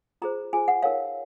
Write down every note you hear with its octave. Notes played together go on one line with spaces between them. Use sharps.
F4 G#4 C5 A#5
F4 G#4 C5 G#5
F#5
D#4 A#4 C#5 F5